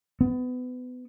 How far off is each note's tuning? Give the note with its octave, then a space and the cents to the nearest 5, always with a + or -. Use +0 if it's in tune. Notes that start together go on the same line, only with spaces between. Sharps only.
B3 +25